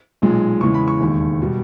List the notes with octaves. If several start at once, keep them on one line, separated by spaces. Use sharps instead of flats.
B1 A#2 G#3
E2 C#3 E3 G#3 C#6
B5
C#6
E1 D#2 D#3
B2 G3